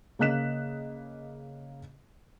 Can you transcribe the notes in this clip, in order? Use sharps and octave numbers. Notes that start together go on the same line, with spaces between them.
C#3 A#3 D#5 F#6 B6 E7